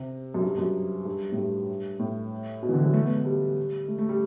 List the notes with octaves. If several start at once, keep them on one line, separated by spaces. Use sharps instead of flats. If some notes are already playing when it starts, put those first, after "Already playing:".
Already playing: C3
F#2
G2
F#2
G2
A2
G2
A2
B2
E3
D3
F#3
A3
B3
A3
G3
A3
A3
G3